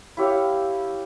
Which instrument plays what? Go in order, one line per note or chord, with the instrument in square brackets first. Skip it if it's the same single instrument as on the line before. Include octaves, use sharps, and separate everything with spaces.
[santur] E4 G4 C#5 F5